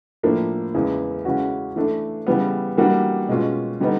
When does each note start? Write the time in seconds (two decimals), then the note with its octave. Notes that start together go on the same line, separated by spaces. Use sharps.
0.23 A2 F3 A#3 D4
0.75 E2 C#3 E3 G#3
1.25 C#3 E3 G#3 C#4 F#4
1.76 E3 A3 D4
2.27 C#3 E3 G3 B3
2.78 E3 G3 A#3 D4 F#4
3.29 B2 G#3 C#4 F4
3.80 D3 G3 B3 D#4